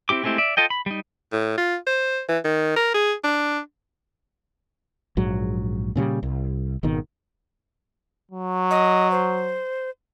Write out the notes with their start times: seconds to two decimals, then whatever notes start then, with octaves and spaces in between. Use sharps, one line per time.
0.09 C4 E4 G4 D6
0.24 G#3 A3 C4 E4 G4
0.38 D5 E5
0.57 F4 A4 D#5 G5
0.70 B5
0.86 G3 D#4
1.33 A2
1.57 F4
1.87 C5
2.29 E3
2.45 D#3
2.76 A#4
2.94 G#4
3.24 D4
5.17 A#1 G#2 F#3
5.96 A#2 C#3 F3 G3
6.23 C2
6.83 G#1 B2 D#3
8.32 F#3
8.71 D#5
9.12 C5